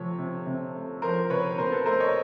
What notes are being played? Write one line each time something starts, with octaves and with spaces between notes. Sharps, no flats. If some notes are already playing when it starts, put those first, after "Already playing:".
Already playing: C3 F3 A3 C#5
C3
C3
A3
F3 A#4 C5
C3 B4 C#5
B2 A#4 C5
A4 B4
A3 A#4 C5
C#5 D#5